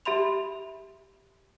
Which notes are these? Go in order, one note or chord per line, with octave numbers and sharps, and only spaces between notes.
G4 E5 B5 C6 F7